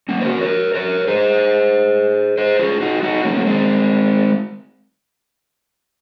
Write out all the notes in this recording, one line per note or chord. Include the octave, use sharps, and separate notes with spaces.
A#3 C#4
C5
F#4 A#4
A#4 C#5
A#4 C#5
G#4 C5
G#4 C5
F4 G#4
D#4 F#4
D#4 F#4
A#3 C#4
A#3
G#3 C4